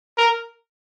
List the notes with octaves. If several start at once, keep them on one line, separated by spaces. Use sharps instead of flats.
A#4